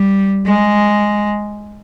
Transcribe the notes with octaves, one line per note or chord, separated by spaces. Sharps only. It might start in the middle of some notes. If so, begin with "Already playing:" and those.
Already playing: G3
G#3